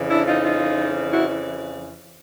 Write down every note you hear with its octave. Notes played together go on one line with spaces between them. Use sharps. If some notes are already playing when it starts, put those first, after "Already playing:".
Already playing: F2 C#3 E3
D4 E4
D#4 F4
D#4 F4
E4 F#4